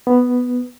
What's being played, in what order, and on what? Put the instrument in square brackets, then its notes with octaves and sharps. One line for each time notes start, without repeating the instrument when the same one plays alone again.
[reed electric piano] B3